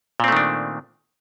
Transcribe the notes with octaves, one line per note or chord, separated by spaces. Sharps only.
A#2 D#3 A3 C4 D4